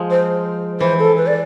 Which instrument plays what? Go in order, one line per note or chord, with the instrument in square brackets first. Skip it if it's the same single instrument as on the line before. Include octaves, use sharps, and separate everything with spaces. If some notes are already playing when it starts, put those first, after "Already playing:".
Already playing: [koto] F3 G#3
[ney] C5
[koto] E3 [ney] C5
[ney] A4
B4
D5